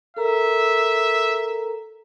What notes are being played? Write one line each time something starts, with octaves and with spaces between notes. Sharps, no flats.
A4 A#4 E5 A#5